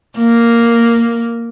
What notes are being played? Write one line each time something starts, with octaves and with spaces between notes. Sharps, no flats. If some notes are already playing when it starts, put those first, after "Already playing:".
A#3